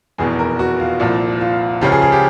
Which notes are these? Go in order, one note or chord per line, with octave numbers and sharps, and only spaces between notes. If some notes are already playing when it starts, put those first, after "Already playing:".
F1 E2 B2 G#4
A#4
F#4
F4
C2 A#2 F3
F4
C#2 C#3 F3 G4
G#4
G#4
G4